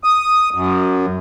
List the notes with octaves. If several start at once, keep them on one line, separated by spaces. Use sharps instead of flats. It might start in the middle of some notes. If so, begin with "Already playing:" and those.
D#6
F#2